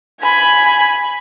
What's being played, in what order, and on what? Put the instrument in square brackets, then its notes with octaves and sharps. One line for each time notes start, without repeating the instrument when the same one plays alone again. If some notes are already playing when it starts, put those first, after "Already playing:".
[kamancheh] G#5 B5